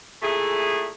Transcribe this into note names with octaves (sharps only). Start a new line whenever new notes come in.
A#2 A3 E4 G#4